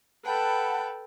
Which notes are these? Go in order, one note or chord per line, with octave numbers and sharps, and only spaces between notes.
A4 B4 F#5 G5 A5 B5